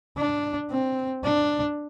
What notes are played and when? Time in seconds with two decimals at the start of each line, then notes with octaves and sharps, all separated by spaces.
0.18 D4
0.71 C4
1.24 D4